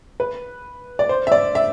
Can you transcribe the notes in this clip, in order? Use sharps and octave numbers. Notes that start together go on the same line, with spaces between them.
B4
D5
C5
E5
D5
E5